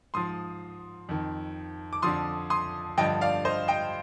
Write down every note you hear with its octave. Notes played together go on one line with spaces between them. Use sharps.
G#2 F3 C6 D#6
F2 D#3
D6
F2 D3 F3 C6 D#6
C6 D#6
G2 D3 F3 D#5 G5
D5 F5
C5 D#5
D#5 G5